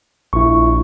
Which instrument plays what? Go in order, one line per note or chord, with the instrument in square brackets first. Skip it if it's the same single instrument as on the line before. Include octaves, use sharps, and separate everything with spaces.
[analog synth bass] A#1 [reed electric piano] E4 C#6